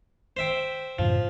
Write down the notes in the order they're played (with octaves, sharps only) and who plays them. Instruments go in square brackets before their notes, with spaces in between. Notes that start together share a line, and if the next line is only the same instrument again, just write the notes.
[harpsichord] C5 E5 G5
[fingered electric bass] F#2 A2 C#3 [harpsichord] F3